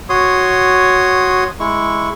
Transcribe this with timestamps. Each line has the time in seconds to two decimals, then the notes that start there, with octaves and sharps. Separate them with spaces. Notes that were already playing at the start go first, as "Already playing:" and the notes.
0.09 F#4 C#5 C6 D#6
1.60 G#3 E4 C#6